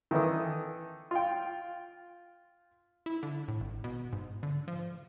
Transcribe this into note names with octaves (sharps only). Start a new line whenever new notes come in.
D#3 E3 A4 B4 D#6
F4 G5
E4
D3
A2
G#1
B2
G#2
D3
F3